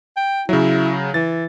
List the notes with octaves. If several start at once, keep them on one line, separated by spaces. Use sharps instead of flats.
G5
C#3 F#3 E4
E3 A6